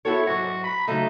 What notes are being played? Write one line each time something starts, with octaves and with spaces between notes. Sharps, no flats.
E4 F#4 A4 C#5
G#2 F#3 F#4
B5
C#3 F#3 A3 D#4